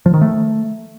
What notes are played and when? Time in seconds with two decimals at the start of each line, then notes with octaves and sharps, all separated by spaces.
0.06 F3
0.14 D#3
0.21 A3